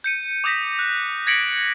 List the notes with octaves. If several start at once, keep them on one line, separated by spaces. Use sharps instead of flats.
G6 C#7 D#7
D6 D#6 G6 A#6 B6
F#6
G#6 A#6 B6 C#7 D7 F#7